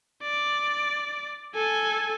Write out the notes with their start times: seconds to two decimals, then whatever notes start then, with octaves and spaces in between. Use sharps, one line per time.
0.23 D5
1.55 A4 G#5